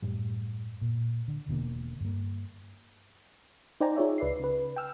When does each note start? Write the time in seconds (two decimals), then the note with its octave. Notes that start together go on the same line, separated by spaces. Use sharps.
0.02 F#2 A2 G3
0.81 A#2
1.28 D3
1.48 E1 B2 D3 A#3
2.01 G2 A#3
3.81 D#4 C5 D5 G5 G#5 A#5
3.96 D#4 F4 G#4 C#5 D5 E5
4.18 C#2 B4 D5 E5 C7
4.40 C#3 B4
4.76 G5 G#5 E6 F6